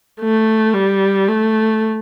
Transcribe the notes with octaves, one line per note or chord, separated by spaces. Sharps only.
A3
G3
A3